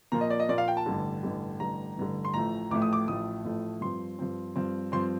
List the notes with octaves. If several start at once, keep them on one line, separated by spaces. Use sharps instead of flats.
A#2 F3 A#3 F4 A#5
D#5
D5
D#5
A#2 F3 A#3 F4 D5
F5
G5
A5
A1 G2 D3
A1 G2 D3
A1 G2 D3 A#5
A1 G2 D3
C6
A1 A2 F3 A3 A#5
A1 A2 F3 A3 D6
D#6
D6
A1 A2 F3 A3 D#6
A1 A2 F3 A3
G2 F3 C4 C6
G2 F3 C4
G2 F3 C4
G2 F3 C4 C6